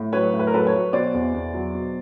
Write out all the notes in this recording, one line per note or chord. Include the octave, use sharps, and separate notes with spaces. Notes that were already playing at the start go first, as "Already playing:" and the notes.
Already playing: A2
F#3 B4 C#5
A2
B4
A#4
F#3 A4 B4
B4 C#5
F#3
B2 C5 D5
E2
E2
F#3
B2